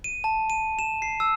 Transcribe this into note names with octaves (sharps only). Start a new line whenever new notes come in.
D#7
A5
D#7
E7
C7
E6